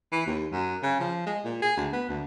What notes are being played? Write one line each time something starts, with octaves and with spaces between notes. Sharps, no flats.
E3
D#2
F#2
C#3
F3
G#3
A#2
G#4
D2
B3
D2